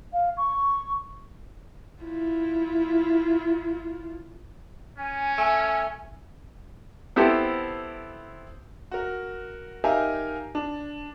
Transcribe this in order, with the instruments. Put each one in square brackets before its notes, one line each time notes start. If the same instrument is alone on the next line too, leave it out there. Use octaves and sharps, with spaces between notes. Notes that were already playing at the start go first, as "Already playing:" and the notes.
[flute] F5
C#6
[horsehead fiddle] E4 F4
[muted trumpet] C#4 [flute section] G#5
[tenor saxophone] A3
[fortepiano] B3 C4 E4 G4 A4 C5
[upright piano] F#4 A#4
D#4 G4 A#4 E5 F5 G#5
D4